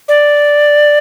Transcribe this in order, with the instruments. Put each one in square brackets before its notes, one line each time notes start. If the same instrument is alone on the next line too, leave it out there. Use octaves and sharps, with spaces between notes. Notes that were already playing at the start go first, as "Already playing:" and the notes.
[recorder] D5